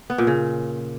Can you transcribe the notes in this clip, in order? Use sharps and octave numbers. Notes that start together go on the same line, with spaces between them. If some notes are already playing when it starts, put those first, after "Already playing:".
B3
A#2
C#3